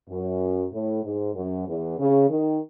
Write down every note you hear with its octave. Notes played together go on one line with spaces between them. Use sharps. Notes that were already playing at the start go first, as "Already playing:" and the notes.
F#2
A2
G#2
F#2
E2
C#3
D#3